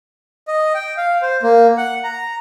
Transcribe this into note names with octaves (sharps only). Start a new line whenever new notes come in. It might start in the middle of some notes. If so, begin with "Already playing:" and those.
D#5
G5
F5
C5
A#3
F#5
A#5